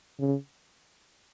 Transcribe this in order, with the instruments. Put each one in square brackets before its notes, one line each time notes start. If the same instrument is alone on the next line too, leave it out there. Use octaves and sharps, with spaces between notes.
[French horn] C#3